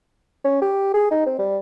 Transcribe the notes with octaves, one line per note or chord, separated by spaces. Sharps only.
C#4
G4
G#4
D#4
C4
G3